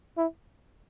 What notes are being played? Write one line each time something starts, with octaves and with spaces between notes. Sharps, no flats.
E4